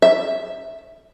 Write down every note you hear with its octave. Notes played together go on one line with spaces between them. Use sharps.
E5